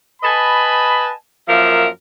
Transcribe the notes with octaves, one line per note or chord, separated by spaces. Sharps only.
B4 D#5 G#5 A5 B5
F#2 F3 A#3 A#4 E5